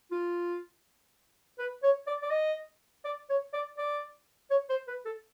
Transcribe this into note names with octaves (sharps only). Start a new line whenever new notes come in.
F4
B4
C#5
D5
D5
D#5
D5
C#5
D5
D5
C#5
C5
B4
A4